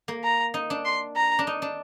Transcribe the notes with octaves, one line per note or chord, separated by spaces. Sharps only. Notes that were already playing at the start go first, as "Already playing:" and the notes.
A#3
A#5
D#4
D4
C6
A#5
D4
D#4
D4